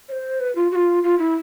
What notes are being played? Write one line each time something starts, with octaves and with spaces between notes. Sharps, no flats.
C#5
C5
B4
F4
F#4
F4
F4
E4